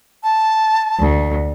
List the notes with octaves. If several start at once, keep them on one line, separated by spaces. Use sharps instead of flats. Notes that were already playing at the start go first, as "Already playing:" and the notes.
A5
D2